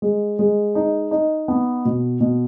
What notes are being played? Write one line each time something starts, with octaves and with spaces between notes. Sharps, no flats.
G#3
G#3
D#4
D#4
B3
B2
B2